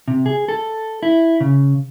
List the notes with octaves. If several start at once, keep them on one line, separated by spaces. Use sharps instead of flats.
C3
G#4
A4
E4
C#3